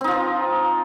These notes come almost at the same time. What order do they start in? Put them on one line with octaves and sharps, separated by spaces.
C4 D#4 F4 F3